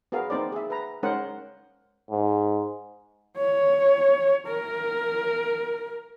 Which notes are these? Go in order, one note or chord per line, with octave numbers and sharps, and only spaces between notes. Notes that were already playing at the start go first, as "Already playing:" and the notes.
B3 F#4 G#4 A#4 F5
A#3 C4 D#4 C5 D5
G#4 E5
B4 A#5
G#3 C#4 D#4 A#4 C5 F#5
G#2
C#5
A#4